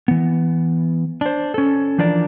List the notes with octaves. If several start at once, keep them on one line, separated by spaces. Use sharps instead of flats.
E3 B3
D4 C5
C#4 A4
E3 F3 D4 A#4 D5